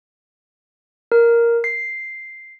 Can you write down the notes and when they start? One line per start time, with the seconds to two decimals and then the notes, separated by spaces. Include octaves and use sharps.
1.12 A#4
1.64 C7